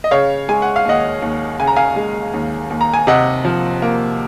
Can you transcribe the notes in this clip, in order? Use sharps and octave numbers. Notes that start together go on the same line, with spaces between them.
D#5
C#3 C#5 F5
G#3 G#5
F#5
F5
D#2 D#5 F#5
D#2
C#3 G#5
A#5
F5 G#5
G#3
D#2
D#2
A#5
G#5
C3 D#5 F#5
F3
A#3